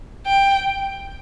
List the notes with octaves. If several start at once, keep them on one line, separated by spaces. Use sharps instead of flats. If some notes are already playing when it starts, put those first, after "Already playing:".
G5